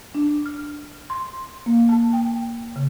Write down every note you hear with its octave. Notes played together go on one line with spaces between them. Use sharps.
D4
F6
C6
A#3
A5
G5
C#3